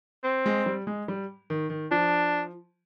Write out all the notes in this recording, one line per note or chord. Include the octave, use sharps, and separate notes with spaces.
C4
G#3
G3
G#3
G3
D#3
D#3
F3 D4